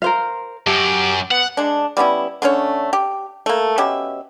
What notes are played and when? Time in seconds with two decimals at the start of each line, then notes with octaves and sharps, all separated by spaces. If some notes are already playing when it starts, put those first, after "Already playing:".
0.02 A#4 C5 F5
0.67 F#2 G4 A5
1.31 B3 F#5
1.57 G#3 D4
1.97 G3 B3 C#4 E4
2.42 D3 A3 C#4 C#5
2.93 G4
3.46 A3 A#3
3.78 B2 C#4 G4 E5